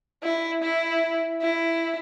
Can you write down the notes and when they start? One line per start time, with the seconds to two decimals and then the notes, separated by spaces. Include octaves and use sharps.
0.23 E4
0.62 E4
1.41 E4